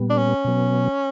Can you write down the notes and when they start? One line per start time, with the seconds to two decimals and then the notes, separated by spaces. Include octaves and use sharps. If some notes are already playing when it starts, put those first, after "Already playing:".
Already playing: A#2 G3 B3
0.10 D4
0.18 C#4
0.45 B2 F#3 B3